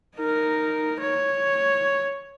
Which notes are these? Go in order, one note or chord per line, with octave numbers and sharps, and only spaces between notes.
D#4 A#4
C#5